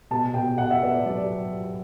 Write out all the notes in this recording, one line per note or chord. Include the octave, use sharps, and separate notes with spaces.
B2 A5
B2 G5
B2 F#5
E5
B3 D5
F#3 D5